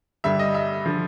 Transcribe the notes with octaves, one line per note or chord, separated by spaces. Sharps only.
G2 D3 G3 E5
D#5
E5
D3 F3